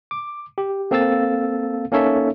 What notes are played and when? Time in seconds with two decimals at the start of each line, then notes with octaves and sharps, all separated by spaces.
0.11 D6
0.58 G4
0.91 A#3 C4 A4 F5 E6 A6
1.92 A#3 C#4 D#4 A4 C#5 E5